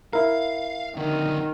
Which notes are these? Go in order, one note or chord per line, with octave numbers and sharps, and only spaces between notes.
E4 A#4 F5
F2 D3 D#3